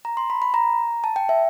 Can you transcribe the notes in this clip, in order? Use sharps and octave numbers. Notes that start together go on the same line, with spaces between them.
A#5
C6
B5
B5
A#5
A5
G5
E5